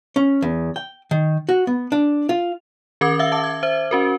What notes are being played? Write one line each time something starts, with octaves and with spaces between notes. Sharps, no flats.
C#4
E2
G5
D#3
F#4
B3
D4
F4
D#3 C#4 A#4 D6 G#6
E5 F5 E6
E5 A5 D6
G#6
C5 E5
C#4 F#4 A#4